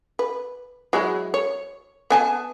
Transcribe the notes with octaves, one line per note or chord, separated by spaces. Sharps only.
B4
F#3 G#3 E4
C#5
B3 G#5 A5